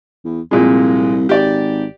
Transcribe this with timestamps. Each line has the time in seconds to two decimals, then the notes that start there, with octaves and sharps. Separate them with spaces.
0.25 E2
0.51 C2 F2 A#2 G#3
1.29 G#1 G4 D5